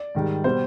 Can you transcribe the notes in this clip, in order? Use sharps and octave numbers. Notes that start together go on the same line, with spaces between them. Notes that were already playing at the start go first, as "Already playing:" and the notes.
Already playing: D5
G#2 D#3 G3
B2 G3 C5